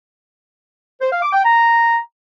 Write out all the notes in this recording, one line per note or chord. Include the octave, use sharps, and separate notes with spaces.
C5
F5
D6
G5
A#5